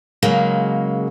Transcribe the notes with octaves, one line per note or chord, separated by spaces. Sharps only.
C#3 F#3 G#3 A#3